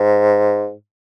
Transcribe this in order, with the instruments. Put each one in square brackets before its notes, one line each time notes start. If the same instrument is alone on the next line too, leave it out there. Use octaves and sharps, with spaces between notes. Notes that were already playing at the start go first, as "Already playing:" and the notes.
Already playing: [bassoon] G#2